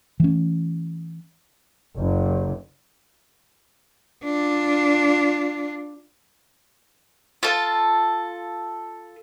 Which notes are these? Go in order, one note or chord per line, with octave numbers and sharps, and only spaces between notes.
E3 A3 C#4
F#1
D4 F4
F4 A4